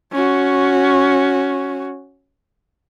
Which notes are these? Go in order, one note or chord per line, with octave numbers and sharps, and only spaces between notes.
C#4 F#4